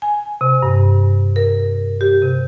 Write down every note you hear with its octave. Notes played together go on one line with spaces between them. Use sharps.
G#5
C3
G2
A#4
G4
C3